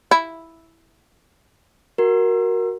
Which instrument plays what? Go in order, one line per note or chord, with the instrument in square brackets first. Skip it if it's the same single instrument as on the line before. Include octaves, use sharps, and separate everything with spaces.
[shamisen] E4
[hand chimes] F#4 A#4